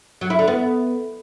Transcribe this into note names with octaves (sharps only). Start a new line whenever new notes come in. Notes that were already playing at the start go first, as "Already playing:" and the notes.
F#3
E4
D3
B3